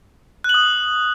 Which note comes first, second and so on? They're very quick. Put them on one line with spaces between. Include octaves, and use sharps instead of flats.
F#6 F#7 D#6